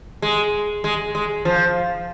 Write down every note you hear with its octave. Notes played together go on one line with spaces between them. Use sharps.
G#3
G#3
G#3
F3